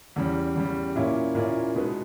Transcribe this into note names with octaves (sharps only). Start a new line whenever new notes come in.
E2 C#3 G3
E2 C#3 G3
A#2 A#3 C#4 E4
A#2 A#3 C#4 E4
B2 G#3 B3 D#4